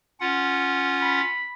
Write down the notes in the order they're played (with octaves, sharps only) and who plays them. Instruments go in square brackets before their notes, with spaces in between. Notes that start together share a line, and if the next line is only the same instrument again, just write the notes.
[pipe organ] C#4 F4 F#5
[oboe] B5